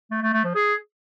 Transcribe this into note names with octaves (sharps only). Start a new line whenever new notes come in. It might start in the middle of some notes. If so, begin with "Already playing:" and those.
A3
A3
A3
F3
G#4